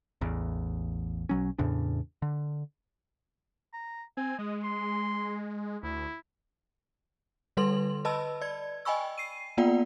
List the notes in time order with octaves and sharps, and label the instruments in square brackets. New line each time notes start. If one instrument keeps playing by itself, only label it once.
[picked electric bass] A1 E2
B1 F#3 C#4
E2 A2 C#3 D4
D3
[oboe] A#5
[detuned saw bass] C4 [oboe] G#5
[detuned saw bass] G#3 [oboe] D#5
[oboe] C6
[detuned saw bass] D2 [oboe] E4
[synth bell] D3 G3 A4 B4 C6 F#7
B4 D#5 A5 B5 E6
D5 G#6
D#5 G5 G#5 B5 C#6 E6
C7 D#7
A#3 B3 F4 D5 F#5 G5